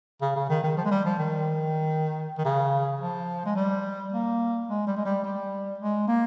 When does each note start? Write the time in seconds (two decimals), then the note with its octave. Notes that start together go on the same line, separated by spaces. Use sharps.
0.22 C#3
0.36 C#3
0.50 D#3
0.64 D#3
0.77 F3
0.85 G#3
0.91 G3
1.05 F3
1.19 D#3
2.38 D#3
2.45 C#3
3.00 F3
3.46 G#3
3.56 G3
4.12 A#3
4.68 G#3
4.87 G3
4.97 G#3
5.05 G3
5.24 G3
5.80 G#3
6.08 A#3